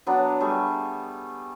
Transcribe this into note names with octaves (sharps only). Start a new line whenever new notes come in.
F#3 B3 D4
G3 A3 G#4 C#6